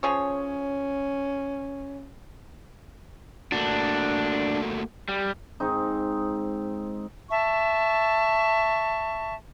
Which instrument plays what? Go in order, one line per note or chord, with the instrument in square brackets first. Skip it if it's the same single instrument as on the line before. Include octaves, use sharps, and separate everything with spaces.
[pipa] F3 G#4 C#5 [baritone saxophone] C#4
[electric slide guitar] A3 A#3 F#4 [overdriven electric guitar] D4
[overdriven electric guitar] G3
[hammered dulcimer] G#2 G#3 C4 D#4
[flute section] E5 A5 C#6